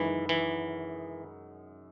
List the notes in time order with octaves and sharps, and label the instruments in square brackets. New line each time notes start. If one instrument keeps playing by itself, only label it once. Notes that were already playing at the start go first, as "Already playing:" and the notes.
Already playing: [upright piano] F#2 D#3 G#3 D#4 [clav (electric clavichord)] E3
[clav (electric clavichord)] E3